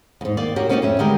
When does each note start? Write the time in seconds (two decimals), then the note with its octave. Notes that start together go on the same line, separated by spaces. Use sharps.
0.21 E2 G#2
0.37 D#3 A#3 D5
0.56 C#4 F#4 G4 A#4
0.69 A#3 C#4 D#4 F#4 C#5 D5
0.82 F2 C#4 E5
0.99 D3 D#3 G3 G#3 G4 A#4